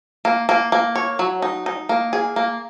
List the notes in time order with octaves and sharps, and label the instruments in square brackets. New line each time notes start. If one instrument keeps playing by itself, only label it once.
[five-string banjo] A#3
A#3
A#3
C#5
F#3
D#4
D#4
A#3
G#4
A#3